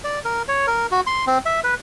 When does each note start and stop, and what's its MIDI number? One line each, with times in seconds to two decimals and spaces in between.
0.04 0.19 74
0.25 0.42 70
0.48 0.66 73
0.67 0.87 70
0.91 1.01 66
1.07 1.25 84
1.27 1.38 60
1.46 1.60 76
1.64 1.75 71